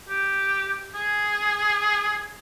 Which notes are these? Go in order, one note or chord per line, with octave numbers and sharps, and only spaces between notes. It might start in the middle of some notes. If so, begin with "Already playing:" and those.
G4
G#4